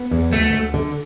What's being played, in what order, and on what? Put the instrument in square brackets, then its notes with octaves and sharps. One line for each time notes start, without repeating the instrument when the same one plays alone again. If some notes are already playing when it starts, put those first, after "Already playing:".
Already playing: [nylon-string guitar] B3
E2
[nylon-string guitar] D2 [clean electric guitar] A3
[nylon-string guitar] D2
D3